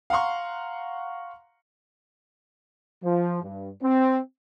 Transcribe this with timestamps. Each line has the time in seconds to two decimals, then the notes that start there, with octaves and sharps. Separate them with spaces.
0.10 F5 F#5 A#5 C6 C#6
3.04 F3
3.43 G2
3.83 C4